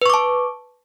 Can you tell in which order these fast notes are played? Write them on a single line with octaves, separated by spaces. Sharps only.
B4 C#6 D6 A5